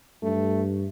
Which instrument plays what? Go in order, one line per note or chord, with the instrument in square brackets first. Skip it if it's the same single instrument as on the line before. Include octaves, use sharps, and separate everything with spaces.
[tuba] G2 [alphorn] A3